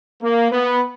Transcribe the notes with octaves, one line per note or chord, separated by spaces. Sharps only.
A#3
B3